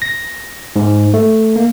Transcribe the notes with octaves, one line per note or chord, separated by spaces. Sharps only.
A#6
G#2
A3
A#3